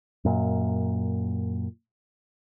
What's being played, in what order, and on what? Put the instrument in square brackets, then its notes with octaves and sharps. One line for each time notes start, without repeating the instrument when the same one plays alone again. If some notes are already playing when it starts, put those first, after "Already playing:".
[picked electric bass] F#2 A#2